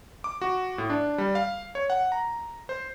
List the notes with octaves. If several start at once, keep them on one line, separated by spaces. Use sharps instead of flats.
D6
F#4
A2
D4
G3
F5
C#5
F#5
A#5
C5